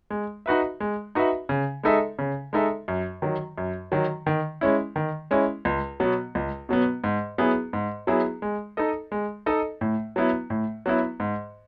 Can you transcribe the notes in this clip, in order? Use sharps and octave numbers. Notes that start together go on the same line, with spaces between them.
G#3
D#4 F#4 B4 E5
G#3
D#4 F#4 B4 E5
C#3
G#3 D#4 A4 E5
C#3
G#3 D#4 A4 E5
F#2
D#3 F#3
F#2
D#3 F#3
D#3
G#3 C#4 E4
D#3
G#3 C#4 E4
C#2
B2 F#3 B3
C#2
B2 F#3 B3
G#2
F#3 B3 E4 G#4
G#2
F#3 B3 E4 G#4
G#3
D#4 A4 D#5
G#3
D#4 A4 D#5
A2
F#3 B3 E4
A2
F#3 B3 E4
G#2